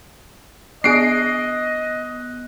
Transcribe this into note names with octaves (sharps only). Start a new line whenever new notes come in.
B3 D4 G#4 D#5 F#6 C7 D7